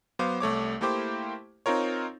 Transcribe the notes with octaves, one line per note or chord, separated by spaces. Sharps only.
F#3 B3 C5 F5 D6
C2 A3 C#5 D6
A3 A#3 E4 G4 C5 D6
C4 D#4 F4 A#4 C#5